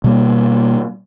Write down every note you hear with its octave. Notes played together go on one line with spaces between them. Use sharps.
B2 G3 A#3